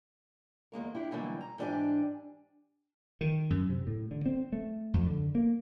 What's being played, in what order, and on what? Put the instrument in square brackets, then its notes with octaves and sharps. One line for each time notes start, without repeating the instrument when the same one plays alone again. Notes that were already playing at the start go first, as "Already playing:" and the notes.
[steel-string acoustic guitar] E2 G#3 A#3 A#4
D4 E4 G4
B2 D3 E3 F#3 G3 A#3
A#5
G#2 E3 D4 G4 G#5
[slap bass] D#3
F#2
C3
A2
D3
C4
A3
F2
D3
A#3